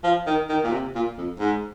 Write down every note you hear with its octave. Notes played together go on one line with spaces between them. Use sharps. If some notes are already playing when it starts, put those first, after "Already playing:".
F3
D#3
D#3
A#2
C3
A#2
F2
G#2